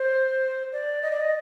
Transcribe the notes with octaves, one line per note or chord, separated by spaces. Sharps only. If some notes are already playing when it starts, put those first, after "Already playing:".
Already playing: C5
D5
D#5
D5
D#5